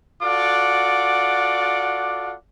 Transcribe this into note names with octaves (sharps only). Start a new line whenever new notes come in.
F4 F#4 A4 D5 F#5 D6